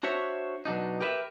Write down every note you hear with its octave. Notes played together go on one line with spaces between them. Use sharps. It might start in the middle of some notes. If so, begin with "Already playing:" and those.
D4 F#4 C5 C#5 E5
B2 F#3 D4 D#4
G4 A#4 B4 D5 E5